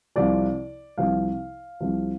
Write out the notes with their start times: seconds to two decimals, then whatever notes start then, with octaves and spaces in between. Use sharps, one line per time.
0.16 C2 C3 F3 D5
0.98 C2 C3 F3 F5
1.81 C2 C3 F3